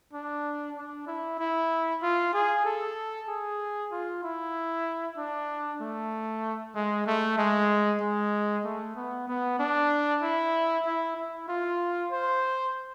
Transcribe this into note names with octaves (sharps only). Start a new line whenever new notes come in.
D4
D4
E4
E4
F4
G#4
A4
G#4
F4
E4
D4
A3
G#3
A3
G#3
G#3
A3
B3
B3
D4
E4
E4
E4
F4
C5